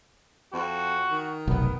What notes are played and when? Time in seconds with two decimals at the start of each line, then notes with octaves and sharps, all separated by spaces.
0.53 F2 F#4
1.11 D#3
1.47 F1 B1 B3